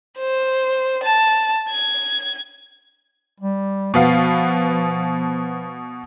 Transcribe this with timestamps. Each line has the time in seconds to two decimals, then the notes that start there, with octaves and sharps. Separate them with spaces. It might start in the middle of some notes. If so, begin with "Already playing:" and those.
0.18 C5
1.03 A5
1.70 G#6
3.40 G3
3.94 B2 F3 B3 F5